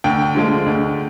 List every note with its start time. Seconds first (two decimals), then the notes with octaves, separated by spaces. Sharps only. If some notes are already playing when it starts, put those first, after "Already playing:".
0.04 D2 G5
0.35 D3 F3 G#3
0.66 D2